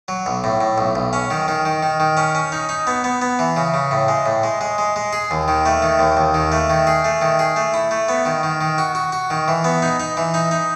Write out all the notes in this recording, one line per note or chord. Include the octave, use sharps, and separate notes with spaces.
F#3
B1
A2
A2
B1
B1
C#4
D#3
D#3
D#3
D#3
D#3
C#4
C#4
D#4
D#4
B3
B3
B3
E3
C#3
C#3
A2
G#3
A2
G#3
G#3
G#3
G#3
G#4
D#2
D#3
A3
D#3
D#2
D#2
D#3
A3
D#3
G#4
A3
D#3
G#4
A3
E4
A3
B3
D#3
D#3
D#3
F#4
F#4
F#4
D#3
E3
B3
D#4
D#4
E3
D#4
D#4